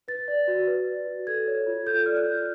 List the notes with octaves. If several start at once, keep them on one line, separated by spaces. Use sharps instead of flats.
B4 A6
D5
F#4
B4
D5
F#4
A4 G#6
C#5
F4
A4 G6
D5 F6
F#6
F4
F#6